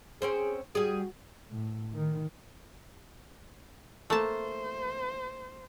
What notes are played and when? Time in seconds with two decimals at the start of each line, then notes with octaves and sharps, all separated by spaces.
0.22 C4 C#4 G#4 C5
0.75 G3 F#4 G#4
1.52 A2
1.94 D#3
4.10 A3 A#3 C5 A5